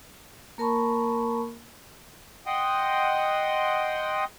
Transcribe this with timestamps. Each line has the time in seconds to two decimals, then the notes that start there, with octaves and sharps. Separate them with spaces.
0.58 A#3 A#4 A5 B5 C#6
2.46 D#5 F#5 G5 C6 D#6